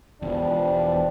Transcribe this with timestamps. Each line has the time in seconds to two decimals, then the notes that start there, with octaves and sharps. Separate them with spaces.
0.22 E1 E2 F3 G3 D4